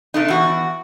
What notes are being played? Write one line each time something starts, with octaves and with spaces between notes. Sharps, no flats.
C3 A3 D#4
E2 F#4